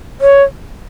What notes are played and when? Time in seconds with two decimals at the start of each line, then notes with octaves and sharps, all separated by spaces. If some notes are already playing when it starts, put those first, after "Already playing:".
0.21 C#5